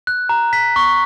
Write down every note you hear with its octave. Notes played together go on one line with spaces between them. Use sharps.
F#6
A#5
B6
C#6